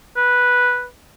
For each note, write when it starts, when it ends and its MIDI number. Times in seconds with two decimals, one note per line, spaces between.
0.16 0.86 71